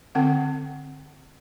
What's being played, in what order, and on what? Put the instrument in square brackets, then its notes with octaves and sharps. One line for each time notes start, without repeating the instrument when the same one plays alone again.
[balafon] D3 C4 F#5